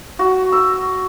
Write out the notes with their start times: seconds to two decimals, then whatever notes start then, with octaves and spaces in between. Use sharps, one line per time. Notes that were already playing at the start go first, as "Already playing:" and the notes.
0.19 F#4
0.52 E6